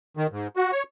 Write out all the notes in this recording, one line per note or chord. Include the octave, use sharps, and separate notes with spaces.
D#3
G#2
F#4
C#5